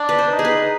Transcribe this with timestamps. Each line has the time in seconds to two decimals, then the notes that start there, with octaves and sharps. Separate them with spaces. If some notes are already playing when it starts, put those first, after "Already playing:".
Already playing: D4 D5
0.09 B4
0.19 C5
0.31 D#4
0.39 G#4
0.45 B4